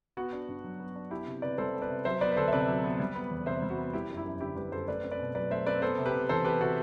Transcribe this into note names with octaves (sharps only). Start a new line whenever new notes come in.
B3 F#4
D4
G2
F#3
B3
D4
B3 E4 G4
C3
C3 B4 D5
G3 A4 C5
B3
B4 D5
C3
F#3 C5 E5
B3 B4 D5
B4
D2 A4 C5
E5
C3 B4 D5
F#3
B3
G3
B3
E2
C3 C5 E5
G3
F#4
B3
G3 E4 G4
F#2
E4 G4
F#2
D3 E4 G4
G3 G4 B4
F#2 A4 C5
A3 B4 D5
C4
B4 D5
B2
F#3 B4 D5
A3 C5 E5
C4 B4 D5
B3 A4 C5
C3
G4 B4
C3
E3 A4 C5
B3 G4 B4
C3 F#4 A4